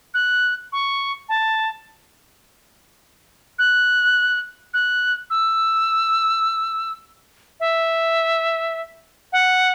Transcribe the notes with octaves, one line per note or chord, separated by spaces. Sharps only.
F#6
C#6
A5
F#6
F#6
E6
E5
F#5